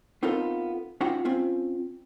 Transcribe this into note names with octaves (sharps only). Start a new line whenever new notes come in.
B3 C4 D#4 F4 A4 A#4
C#4 D#4 F4 F#4 F#5 G5
C4 C#4 F4